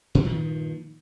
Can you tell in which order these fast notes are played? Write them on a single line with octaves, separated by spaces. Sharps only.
A#2 G2 D#3 F3